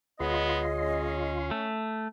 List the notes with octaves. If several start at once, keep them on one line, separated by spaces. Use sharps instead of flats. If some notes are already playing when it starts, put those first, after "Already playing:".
D2 G#3 B3 F4 C#5 D#5 C6
C#4
A3